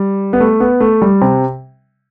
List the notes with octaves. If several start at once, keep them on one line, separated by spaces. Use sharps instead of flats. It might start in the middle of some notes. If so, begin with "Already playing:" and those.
Already playing: G3
B3
A3
B3
A3
G3
C3